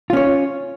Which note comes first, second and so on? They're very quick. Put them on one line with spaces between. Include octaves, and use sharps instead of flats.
F4 C#4 C#5